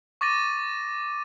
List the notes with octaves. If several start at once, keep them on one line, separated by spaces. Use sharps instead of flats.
C#6 D6 A6 A#6 D#7